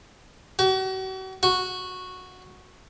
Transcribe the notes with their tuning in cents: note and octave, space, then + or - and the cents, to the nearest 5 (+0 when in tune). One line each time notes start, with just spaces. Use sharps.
F#4 +40
F#4 -10